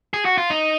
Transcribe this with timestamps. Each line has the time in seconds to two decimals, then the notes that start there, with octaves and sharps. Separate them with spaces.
0.13 G#4
0.25 F#4
0.38 F4
0.50 D#4